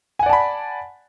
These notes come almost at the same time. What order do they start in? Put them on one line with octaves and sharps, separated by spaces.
G#5 F#5 D5 A5 B5